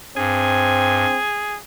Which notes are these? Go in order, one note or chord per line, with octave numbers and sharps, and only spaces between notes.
G2 C4 G#4